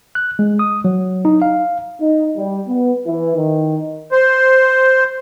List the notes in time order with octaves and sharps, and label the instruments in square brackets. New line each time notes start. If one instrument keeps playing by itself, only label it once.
[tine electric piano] F#6
G#3
D#6
F#3
D#4
F5
[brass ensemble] D#4
G3
B3
E3
D#3
[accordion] C5